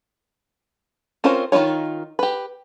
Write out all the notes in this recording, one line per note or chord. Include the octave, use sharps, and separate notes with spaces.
C4 C#4 F4 A#4 C5
D#3 A#3 D#4 F4 C#5
G4 B4